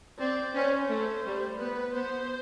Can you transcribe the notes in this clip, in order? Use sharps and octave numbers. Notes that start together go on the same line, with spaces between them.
C4 D5
C#4 C5
A3
G3
B3 B4
B3 C5